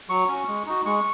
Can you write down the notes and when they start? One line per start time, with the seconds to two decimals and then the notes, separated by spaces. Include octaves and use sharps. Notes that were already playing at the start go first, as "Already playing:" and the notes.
0.09 F#3 C#6
0.28 C#4 F#4
0.48 G#3
0.66 D#4 F#4
0.85 G#3 C#6